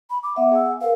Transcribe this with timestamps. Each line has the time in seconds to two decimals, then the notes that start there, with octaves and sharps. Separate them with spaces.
0.10 B5
0.23 D6
0.36 B3 E5 F#5
0.51 G#4 G#5 E6
0.81 A#4 B4 F5